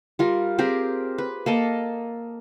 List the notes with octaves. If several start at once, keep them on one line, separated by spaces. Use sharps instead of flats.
G3 F4 A#4
C4 G4 G#4 A#4
B4
A#3 A4 D#5 A5